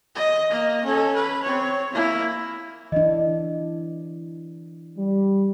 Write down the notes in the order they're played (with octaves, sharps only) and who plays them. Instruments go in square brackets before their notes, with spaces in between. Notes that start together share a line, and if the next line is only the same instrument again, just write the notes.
[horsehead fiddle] D#5
A#3 D#5
C#4 A4
B4
C4 C#5
A#3 E4
[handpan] E3 D4 [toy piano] D#5
[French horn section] G3